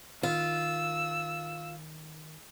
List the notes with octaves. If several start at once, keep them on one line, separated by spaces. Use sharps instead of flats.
D#3 F4 E6